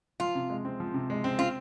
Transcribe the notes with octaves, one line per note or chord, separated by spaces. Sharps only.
F3 F4
C3
G#3
C4
F3
C3
G#3
C4
C4 F4